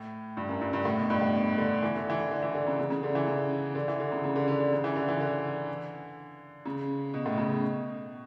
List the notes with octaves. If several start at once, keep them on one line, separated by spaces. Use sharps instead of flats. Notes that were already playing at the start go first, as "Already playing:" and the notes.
Already playing: A2
G2
F#2
G2
G2
A2
B2
G2
A2
B2
D3
E3
D3
E3
D3
E3
D3
C#3
C#3
C#3
D3
E3
C#3
D3
E3
D3
C#3
C#3
D3
D3
D3
C#3
E3
D3
E3
D3
C#3
B2
A2
C#3
B2